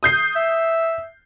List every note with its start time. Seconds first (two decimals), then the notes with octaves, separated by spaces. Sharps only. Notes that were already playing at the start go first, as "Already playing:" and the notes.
0.03 D#6 G6 C7
0.36 E5